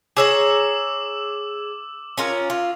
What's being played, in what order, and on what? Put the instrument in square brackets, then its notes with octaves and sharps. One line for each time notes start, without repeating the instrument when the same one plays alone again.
[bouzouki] G#4 C#5 A#5 [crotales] D6 E6 E7
[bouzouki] C#4 F4 A#4
F4